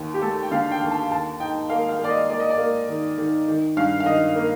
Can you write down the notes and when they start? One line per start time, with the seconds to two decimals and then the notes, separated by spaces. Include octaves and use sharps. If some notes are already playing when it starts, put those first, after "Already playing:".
Already playing: D#2
0.14 G4
0.22 A3 A4
0.43 G5
0.51 D3 F5
0.71 G5
0.82 D#2
0.91 A5
1.11 D#2 A5
1.40 D#4 G5
1.70 A#3 F5
1.89 F5
1.99 A#3 D5
2.10 D#5
2.29 A#3 D5
2.40 D#5
2.50 D5
2.58 A#3
2.89 D#3
3.18 D#3
3.48 D#3
3.76 G2 F5
4.00 F5
4.06 D#3 D#5
4.35 A#3